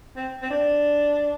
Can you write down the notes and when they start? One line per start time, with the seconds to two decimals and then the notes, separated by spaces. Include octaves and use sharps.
0.16 C4
0.42 C4
0.50 D4